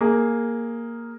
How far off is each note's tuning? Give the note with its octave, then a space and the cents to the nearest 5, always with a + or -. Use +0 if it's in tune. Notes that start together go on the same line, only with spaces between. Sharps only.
A#3 +0 G#4 +0